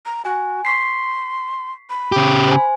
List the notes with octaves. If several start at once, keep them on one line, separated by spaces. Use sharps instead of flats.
A#5
F#4 G#5
C6 C#6 B6 C7
B5
C#3 G4
C5 G#5